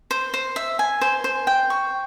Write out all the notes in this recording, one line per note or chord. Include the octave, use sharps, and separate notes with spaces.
C5
C5
E5
G#5
C5
C5
G5
C#6